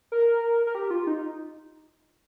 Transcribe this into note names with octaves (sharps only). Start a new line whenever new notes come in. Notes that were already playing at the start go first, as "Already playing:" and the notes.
A#4
A#4
G4
F4
D#4